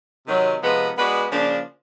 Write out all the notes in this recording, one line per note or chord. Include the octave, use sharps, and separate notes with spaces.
C3 D#3 F#3
C3 F3 G#3 B3
G#3 B3 D4 F#4 B4
C#3 F3 A#3 D4